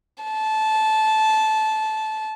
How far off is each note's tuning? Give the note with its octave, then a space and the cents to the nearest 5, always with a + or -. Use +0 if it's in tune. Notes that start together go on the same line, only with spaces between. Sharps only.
A5 -15